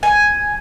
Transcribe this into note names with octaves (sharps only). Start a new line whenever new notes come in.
G#5